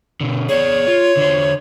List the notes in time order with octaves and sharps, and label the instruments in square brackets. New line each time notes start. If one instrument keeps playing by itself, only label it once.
[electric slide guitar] B2 D3
[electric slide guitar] G#4 D5 [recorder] C#5
[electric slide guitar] F4
D3 C5